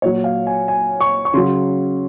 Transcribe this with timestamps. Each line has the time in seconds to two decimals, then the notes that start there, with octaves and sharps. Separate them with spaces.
0.02 A#2 F#3 C#5
0.24 F5
0.47 G#5
0.68 G#5
1.01 C#6
1.25 C#6
1.33 C#3 F#3 C6